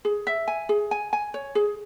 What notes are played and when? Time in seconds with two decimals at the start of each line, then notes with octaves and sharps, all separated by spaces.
0.05 G#4
0.27 E5
0.48 G#5
0.69 G#4
0.91 G#5
1.13 G#5
1.34 C#5
1.55 G#4